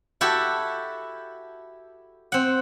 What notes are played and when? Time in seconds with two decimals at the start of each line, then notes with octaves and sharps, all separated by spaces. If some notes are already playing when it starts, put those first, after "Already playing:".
0.21 E4 F#4 G4 A4
2.32 C4 F#5